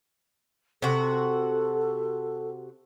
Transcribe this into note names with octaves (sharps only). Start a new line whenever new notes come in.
C3 F#4 A4